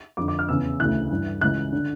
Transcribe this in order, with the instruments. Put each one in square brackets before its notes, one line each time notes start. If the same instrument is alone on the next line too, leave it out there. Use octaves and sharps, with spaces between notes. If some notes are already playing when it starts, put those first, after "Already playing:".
[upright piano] F2 D3 D6
D6
F6
E2 C#3 E3 E6
D2 C#3 E3 F#6
G2 E3
C#2 C#3 E3 F#6
D3